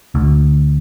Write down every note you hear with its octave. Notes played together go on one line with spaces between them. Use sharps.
D2